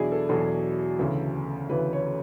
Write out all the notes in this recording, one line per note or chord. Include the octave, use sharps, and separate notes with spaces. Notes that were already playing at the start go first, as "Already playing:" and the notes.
Already playing: E2 B2 F#3 D4 E4 G#4
A4
E2 B2 F#3 A4
D2 C#3 E3
D2 C#3 E3 B4
C#5